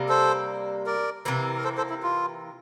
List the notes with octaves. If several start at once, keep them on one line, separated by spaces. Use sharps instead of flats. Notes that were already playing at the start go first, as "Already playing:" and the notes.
Already playing: C3 G3 A#3
A4 C5
A#4 D5
C3 E3 A#3
A#4
A4 C5
A4 C5
E4
F4